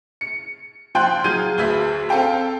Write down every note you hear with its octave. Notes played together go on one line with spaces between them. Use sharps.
C#7
F3 G5 C6 F#6
F#3 F4 G#4 F6 G6 D#7
D2 G#4 B4 E5
C4 A4 F5 G5 A#5